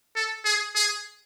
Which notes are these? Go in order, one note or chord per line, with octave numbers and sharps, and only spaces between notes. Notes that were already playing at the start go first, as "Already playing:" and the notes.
A4
G#4
G#4